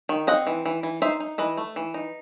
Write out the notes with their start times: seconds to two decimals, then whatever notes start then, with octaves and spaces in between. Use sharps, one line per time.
0.09 D#3
0.27 C4 D#5 F#5
0.47 E3
0.66 E3
0.83 E3
1.02 D#4 C5 E5
1.20 D#4
1.38 E3 B4 D#5
1.57 A3
1.76 E3
1.94 D#4